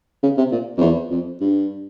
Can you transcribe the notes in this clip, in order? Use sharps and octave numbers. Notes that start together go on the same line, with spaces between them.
C#3
C3
A#2
F2
E2
F2
G2